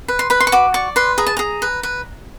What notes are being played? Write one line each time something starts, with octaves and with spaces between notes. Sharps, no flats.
B4
C6
B4 B5
C6
C#6
F#4 D6
D5 C#6
B4 C6
G#4 A#5
A5
G#4 A#5
B4
B4